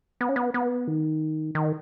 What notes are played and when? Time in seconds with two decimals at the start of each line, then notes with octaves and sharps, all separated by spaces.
0.21 B3
0.29 C#4
0.36 B3
0.54 B3
0.88 D#3
1.55 D#3